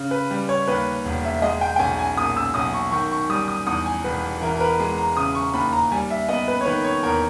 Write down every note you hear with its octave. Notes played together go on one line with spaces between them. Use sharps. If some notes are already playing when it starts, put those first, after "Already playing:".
Already playing: C#3
B4
G3
C#5
D#2 B4
E1
E5
G#3 D#5
G5
G5
B1 G#5
G#5
A#2 D#6
E6
B1 D#6
C#6
D#3 C#6
C#6
G3 D#6
D#6
E2 D#6
G#5
E1 B4
E3 A#4
A#4
B4
G#3
A#5
C#3 D#6
C#6
D#2 B5
A#5
G3 G#5
E5
B3 D#5
B4
C#5
D#3 B4
C#5
E2 A#4